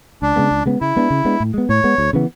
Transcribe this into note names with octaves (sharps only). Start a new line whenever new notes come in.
C#2 D4
C#3 G#3 B3
C#2
C#3 G#3 B3
C#3 E4
G#3 B3 D4
C#3
G#3 B3 D4
A2
G#3 B3
A2 C#5
G#3 B3
D2
C#3 E3 B3